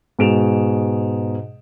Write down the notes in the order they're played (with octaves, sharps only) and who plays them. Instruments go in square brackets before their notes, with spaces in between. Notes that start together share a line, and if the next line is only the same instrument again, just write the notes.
[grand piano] G#2 B2 G#4 D7 E7 F7